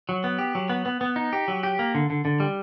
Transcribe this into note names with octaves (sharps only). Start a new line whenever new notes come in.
F#3
B3
G4
F#3
B3
B3
B3
D#4
G4
F#3
G4
A#3
D3
D3
D3
G3